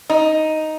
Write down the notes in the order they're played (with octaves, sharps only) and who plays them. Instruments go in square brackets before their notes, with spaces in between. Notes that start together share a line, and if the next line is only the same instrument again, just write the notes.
[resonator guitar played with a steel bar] D#4